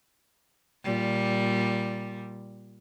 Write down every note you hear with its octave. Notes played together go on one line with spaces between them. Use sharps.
A#2 G3